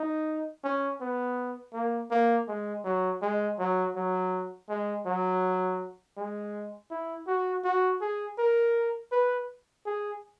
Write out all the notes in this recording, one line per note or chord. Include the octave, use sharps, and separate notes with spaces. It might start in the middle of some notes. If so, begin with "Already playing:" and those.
Already playing: D#4
C#4
B3
A#3
A#3
G#3
F#3
G#3
F#3
F#3
G#3
F#3
G#3
E4
F#4
F#4
G#4
A#4
B4
G#4